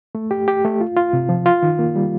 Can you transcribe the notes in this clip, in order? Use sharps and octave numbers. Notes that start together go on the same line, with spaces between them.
A3
G4
G4
A3
F4
F4
C3
F3
F4
D#3
A#3
G3